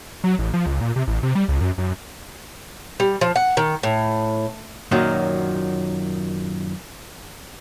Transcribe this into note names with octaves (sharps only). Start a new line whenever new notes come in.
F#3
A1
F3
C#2
A#2
C3
A1
C3
G3
C#2
F#2
F#2
G3
F3
F#5
D#3
A2
F#2 A#2 D#3 F#3